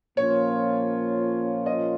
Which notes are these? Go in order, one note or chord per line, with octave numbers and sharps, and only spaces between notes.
A#2 F3 A#3 C#4 F4 C#5
D#5